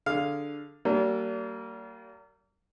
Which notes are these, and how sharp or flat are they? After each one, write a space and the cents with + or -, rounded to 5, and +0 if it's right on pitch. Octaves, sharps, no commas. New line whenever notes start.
D3 +0 G#4 +0 F5 +0
G3 -45 A#3 -25 D4 -35